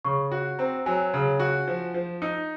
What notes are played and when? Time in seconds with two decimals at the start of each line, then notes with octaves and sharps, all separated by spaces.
0.05 C#3 C#6
0.32 F#4
0.59 C4 A#5
0.86 F#3 G#5
1.14 C#3
1.40 F#4
1.67 F3
1.94 F3
2.22 D#4